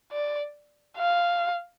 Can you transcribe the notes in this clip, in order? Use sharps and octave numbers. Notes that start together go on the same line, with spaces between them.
D5
F5